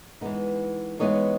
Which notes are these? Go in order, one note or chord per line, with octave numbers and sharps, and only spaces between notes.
E3 G#3 B3 D#4
E3 G#3 B3 D#4 C#5 D#5